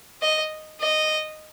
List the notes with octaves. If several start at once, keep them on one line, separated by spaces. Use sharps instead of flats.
D#5
D#5